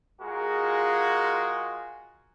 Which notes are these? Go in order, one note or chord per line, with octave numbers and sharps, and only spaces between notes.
G#3 F4 F#4 G#4 A#4